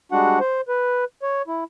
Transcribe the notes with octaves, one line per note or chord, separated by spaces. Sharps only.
G3 G#3 D4 F#4 F#5
C5
B4
C#5
E4